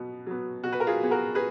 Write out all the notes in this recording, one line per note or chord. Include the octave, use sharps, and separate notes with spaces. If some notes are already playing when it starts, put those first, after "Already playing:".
Already playing: B2 F#3 B3
F#3 B3
B2 F#4
B4
A#4
F4 G#4
F#3 B3 G#4
F#4 A#4
G#4 B4